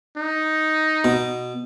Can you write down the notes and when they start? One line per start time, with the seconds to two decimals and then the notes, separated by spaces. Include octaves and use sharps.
0.17 D#4
1.04 B2